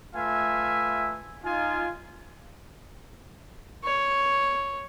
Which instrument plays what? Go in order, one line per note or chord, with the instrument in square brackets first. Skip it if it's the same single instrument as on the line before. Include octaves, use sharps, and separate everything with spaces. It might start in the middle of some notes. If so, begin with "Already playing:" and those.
[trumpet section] A3 F4 B4 E5 F5 G#5
D#4 F4 G#5
[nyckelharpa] C#5